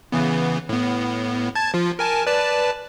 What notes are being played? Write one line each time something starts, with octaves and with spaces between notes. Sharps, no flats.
C#3 E3 B3
A2 B3
A5 G#6 A6
F3 F4
A#4 G#5 A5
B4 D5 A5